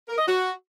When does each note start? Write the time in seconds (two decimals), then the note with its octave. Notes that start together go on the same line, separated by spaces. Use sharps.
0.09 A#4
0.18 D#5
0.28 F#4